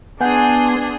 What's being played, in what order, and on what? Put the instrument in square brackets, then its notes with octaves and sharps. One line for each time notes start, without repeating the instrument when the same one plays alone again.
[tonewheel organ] B3 [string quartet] D4 G#4 C6 [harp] F#5 G6 [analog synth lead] G#5